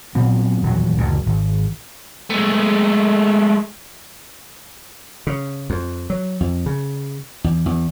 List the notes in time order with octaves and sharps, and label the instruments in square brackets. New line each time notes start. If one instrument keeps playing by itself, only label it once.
[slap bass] A#2 F#3 B3 C4
D#1 E2 F#3
F#1 D2 G2 A#2
G#1
[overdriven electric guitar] G#3 A3
[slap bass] C#3
F2
F#3
F2
C#3
E2
E2